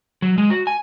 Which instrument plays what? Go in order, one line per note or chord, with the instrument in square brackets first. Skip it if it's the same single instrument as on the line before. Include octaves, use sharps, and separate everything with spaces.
[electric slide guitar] F#3
G#3
F#4
G#5